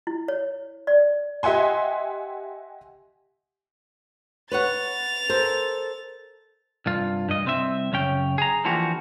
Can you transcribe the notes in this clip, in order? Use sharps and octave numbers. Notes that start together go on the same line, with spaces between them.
E4
C#5
D5
G4 D#5 E5 F#5 G#5 C6
B4 C#5 F#5 A6 F7
A4 A#4 C5
C2 G2 F4
G2 D#5
C2 C4 E5
F#2 C#3 C#4 G5
G#4 A#5
D3 E3 F3 A#3 F#4 G4